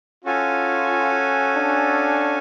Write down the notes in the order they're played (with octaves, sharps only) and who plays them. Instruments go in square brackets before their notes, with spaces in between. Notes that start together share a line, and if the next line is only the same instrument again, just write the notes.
[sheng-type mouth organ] C#4 F#4 A4 F5 G#5 [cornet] F4
[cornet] D4